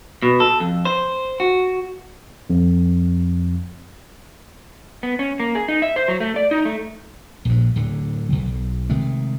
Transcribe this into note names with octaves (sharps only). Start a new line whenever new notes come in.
B2
A4
F2
C5
F#4
F2
B3
C#4
A#3
G#4
D#4
E5
C5
F#3
A3
D5
D#4
A3
A#1 G2
D1 D3
B1
C3 D#3 G#3 A3